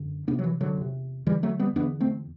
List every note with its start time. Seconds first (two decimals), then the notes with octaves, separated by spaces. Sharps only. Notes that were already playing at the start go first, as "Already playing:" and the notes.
Already playing: F#2 D3
0.27 E2 C3 B3 D4
0.39 F#3
0.44 E3
0.61 D3 F#3
0.77 E2 C3
1.26 E2 D3 E3 G3
1.43 F#3 A3
1.59 G3 B3
1.76 E2 D3 B3 D4
2.00 A3 C4